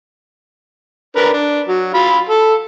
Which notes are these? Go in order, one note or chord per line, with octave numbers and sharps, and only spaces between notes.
D4 A#4 B4
D4
F#3
F4 F5 B5
A4